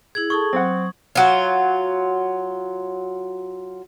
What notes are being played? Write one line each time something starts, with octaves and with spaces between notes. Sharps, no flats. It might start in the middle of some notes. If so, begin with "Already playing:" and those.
E4 G#4 G#6 F#7
G#4 A4 A5 C#6 D#6
F#3 C4 F#5
F#3 F4